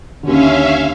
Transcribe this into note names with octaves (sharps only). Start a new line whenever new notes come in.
D#2 D3 C#4 E5 F5